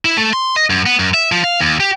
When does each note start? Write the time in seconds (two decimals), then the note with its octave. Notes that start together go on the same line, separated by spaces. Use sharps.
0.05 E4
0.17 A3
0.33 C6
0.56 D#5
0.70 F#2
0.86 B3
0.99 F#2
1.14 E5
1.32 F3
1.44 F5
1.60 D#2
1.80 G4